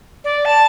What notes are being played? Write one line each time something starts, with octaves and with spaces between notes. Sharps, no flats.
D5
A5